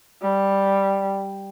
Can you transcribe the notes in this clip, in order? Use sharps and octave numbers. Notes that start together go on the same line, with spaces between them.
G3